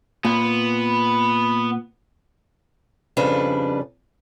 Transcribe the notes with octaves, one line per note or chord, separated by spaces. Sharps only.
A#2 B3
F2 C#3 G3 D4 B4